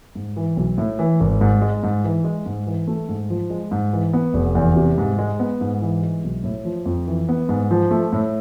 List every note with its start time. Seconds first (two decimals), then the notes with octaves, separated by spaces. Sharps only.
0.15 G#2
0.36 E3
0.56 B1
0.78 A2
0.99 E3
1.20 G#1
1.41 G#2
1.61 G#3
1.83 G#2
2.04 E3
2.24 G#3
2.46 G#2
2.67 E3
2.87 A3
3.08 G#2
3.30 F3
3.50 G#3
3.71 G#2
3.93 E3
4.13 B3
4.34 F1
4.55 E2
4.76 C3
4.98 G#2
5.18 G#3
5.40 B3
5.61 G#2
5.81 E3
6.03 G#3
6.24 B1
6.44 A2
6.65 F3
6.86 F2
7.07 E3
7.29 B3
7.49 G#2
7.71 F3
7.91 A3
8.13 A2